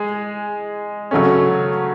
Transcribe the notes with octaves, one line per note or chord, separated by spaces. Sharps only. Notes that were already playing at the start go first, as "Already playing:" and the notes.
Already playing: G#3 G#4
C#3 F#3 A3 C#4